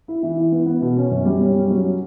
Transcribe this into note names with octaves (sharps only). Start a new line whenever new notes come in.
E4
E3
E4
B3
B3
B2
C#4
F#2
G3
C#4
G3
F#3